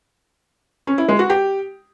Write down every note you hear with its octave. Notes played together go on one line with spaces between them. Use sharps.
C#4
E4
G#3
F#4
G4